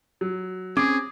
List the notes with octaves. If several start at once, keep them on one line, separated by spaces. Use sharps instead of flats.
F#3
C4 C#4 G#4 D6